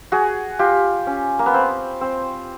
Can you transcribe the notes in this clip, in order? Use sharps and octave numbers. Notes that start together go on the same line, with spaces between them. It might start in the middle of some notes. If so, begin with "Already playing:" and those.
F#4 G#4
F4 G4
C#4
A#3
B3
C4
C4